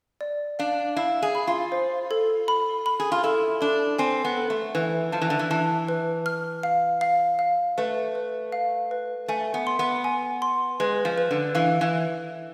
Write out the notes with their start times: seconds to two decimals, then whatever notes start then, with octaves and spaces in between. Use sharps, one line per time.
0.21 D5
0.59 D4 F5
0.96 E4 F5
1.22 G#4
1.35 B5
1.47 F4
1.72 C5
2.11 A4
2.48 B5
2.86 B5
3.00 G#4
3.12 F4
3.24 E4 A4
3.61 D4 A4
3.99 C4 G#5
4.25 B3
4.37 A4
4.50 A3
4.75 E3 B4
5.12 F3 A5
5.21 E3
5.30 D3
5.39 E3
5.50 E3 A5
5.89 B4
6.26 F6
6.63 F5
7.01 F5
7.39 F5
7.78 A3 B4
8.15 B4
8.52 F5
8.91 B4
9.28 A3 G#5
9.54 B3
9.67 C6
9.79 B3
10.04 G#5
10.42 C6
10.80 G#3 B4
11.05 F3
11.18 B4
11.31 D3
11.55 E3 F5
11.81 E3